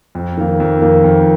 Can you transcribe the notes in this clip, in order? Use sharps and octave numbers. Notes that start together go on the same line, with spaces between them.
F2
D#3 A#3
F2
D#3 A#3
F2